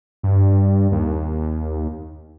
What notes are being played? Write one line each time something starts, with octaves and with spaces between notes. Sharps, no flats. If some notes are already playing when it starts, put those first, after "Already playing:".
G2
D#2